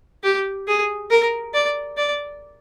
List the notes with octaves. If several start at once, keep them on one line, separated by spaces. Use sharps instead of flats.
G4
G#4
A#4
D5
D5